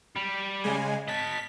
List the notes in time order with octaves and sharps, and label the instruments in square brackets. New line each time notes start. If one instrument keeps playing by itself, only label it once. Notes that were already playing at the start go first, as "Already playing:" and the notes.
[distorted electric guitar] G3
[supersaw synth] C#3 G#3 G#5
[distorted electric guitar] D#5 A5 [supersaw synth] B6